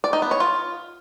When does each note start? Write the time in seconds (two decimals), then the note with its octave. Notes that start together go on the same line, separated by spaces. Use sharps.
0.04 D5
0.13 D#4
0.22 B3
0.31 C#5
0.40 F4